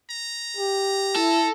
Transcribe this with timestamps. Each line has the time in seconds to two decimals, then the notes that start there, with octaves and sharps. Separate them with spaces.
0.10 A#5
0.57 G4
1.15 E4 A4